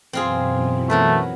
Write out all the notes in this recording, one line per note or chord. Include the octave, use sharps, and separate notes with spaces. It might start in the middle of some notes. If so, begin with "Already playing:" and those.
F#2 B2 E3 C4 F4 G#4
F#3 A3 A#4 B4